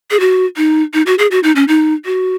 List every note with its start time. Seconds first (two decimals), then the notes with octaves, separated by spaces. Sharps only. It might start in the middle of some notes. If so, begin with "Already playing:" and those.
0.11 G#4
0.20 F#4
0.57 D#4
0.94 D#4
1.06 F#4
1.19 G#4
1.31 F#4
1.43 D#4
1.56 C#4
1.68 D#4
2.05 F#4